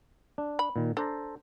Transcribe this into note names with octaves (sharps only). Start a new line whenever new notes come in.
D4
B5
A#2 D#3
D4 A4 C5 A#5